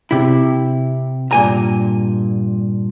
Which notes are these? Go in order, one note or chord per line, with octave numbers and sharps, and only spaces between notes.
C3 E4
G2 A#2 G#5 A#5